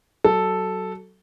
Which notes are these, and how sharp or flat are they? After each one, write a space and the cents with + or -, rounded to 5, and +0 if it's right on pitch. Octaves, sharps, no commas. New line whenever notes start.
F#3 +25 A4 +0